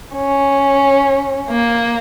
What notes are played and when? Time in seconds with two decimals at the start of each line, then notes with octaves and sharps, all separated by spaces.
0.16 C#4
1.50 A#3